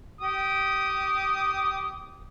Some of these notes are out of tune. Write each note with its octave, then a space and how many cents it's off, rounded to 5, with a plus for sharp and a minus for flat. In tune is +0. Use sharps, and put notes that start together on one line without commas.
G4 -20 D#6 +0